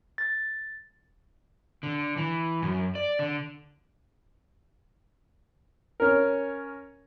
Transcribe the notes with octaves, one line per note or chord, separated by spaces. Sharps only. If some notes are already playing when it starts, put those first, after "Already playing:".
A6
D3
E3
F#2
D5
D3
C#4 A#4